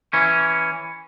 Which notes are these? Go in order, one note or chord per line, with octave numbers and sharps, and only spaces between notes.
E3 C#4